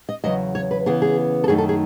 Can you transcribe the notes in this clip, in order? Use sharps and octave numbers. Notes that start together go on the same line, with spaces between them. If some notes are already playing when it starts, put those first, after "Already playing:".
D#5
E2 C#3 F#3 D#5
C#5
B4
C#3 E3 B3 G#4
G#4
A4
F#2 D#3 A3 D#4 G#4
A4
G#4